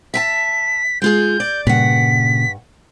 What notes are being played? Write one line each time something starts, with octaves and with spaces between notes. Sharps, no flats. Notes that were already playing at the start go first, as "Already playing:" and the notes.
E5 G5 A5 B6
G#3 F4 G#4 G6
D5
G2 A#2 C#3 F#5 B6